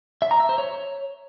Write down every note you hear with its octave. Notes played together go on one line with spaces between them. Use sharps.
E5
A#5
E5
C5
C#5